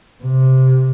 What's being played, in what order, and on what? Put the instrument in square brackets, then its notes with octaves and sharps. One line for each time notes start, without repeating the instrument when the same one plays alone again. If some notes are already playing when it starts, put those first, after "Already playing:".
[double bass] C3